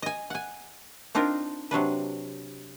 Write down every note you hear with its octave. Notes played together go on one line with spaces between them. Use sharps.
D#5 G#5
F#5 G#5
C4 D4 D#4 F4 A#4
C3 F#3 D4 B4